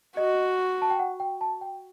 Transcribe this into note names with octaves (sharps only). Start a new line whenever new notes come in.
F#4 D#5
A5
G5
F#5
G5
A5
G5